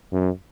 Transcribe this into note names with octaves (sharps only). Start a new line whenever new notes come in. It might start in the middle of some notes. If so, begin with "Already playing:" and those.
F#2